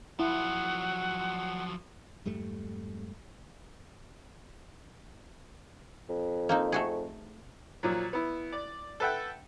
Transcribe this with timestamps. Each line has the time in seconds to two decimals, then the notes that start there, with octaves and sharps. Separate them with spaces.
0.19 F3 F#3 E4 F#5
2.26 F2 G#2 G3 A3
6.09 F2
6.49 A#3 C4 D#4
6.72 A3 F#4 G#4
7.83 A#2 F3 F#3
8.13 B3 E4
8.52 D5
9.00 A4 B4 E5 F#5 G5